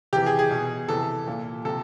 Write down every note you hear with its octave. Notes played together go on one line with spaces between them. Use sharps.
C3 E3 G4
G#4
G#4
B2
C3 E3 A4
A#2
C3 A4